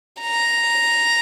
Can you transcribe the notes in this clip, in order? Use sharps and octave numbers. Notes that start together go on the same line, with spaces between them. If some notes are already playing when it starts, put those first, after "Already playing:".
A#5